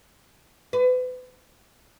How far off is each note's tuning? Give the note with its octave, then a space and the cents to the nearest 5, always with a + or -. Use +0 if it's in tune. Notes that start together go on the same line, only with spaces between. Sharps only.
B4 +35